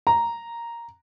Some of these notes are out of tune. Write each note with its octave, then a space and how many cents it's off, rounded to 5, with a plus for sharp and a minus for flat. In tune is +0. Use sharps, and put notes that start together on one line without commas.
A#5 +0